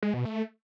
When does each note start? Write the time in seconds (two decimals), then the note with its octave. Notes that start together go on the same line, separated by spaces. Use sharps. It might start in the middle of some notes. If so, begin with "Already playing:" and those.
0.03 G#3
0.14 B2
0.25 A3